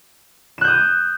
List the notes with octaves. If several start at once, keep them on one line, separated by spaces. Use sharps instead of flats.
D#6 F#6 G6 E7